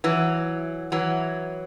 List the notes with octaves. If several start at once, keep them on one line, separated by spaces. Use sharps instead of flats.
E3 F#3
E3 F#3